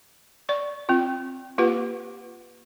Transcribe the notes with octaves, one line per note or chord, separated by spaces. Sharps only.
D5 C#6
C4 F4
A#3 F4 G4 B4 F#5